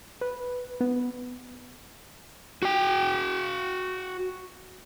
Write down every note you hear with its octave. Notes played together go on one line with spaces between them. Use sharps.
B4
B3
F#4 G5